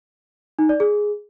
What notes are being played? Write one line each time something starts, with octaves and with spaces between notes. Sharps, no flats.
D#4
D5
G#4